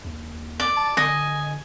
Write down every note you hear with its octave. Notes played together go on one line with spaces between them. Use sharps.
D#2
D5
A5
D3 D#5 G#5